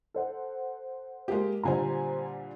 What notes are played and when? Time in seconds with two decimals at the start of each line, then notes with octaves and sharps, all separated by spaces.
0.14 A4 C5 F#5
1.28 G#3 A#3 G4
1.63 A#2 D3 G3 C5 G#5 A#5